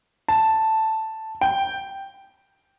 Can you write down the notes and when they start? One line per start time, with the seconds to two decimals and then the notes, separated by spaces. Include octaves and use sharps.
0.28 A5
1.41 G5